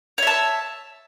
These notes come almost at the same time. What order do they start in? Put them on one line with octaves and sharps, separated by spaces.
C#5 E5 A5